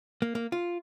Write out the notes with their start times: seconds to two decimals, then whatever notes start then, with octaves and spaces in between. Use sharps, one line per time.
0.22 A#3
0.35 A#3
0.52 F4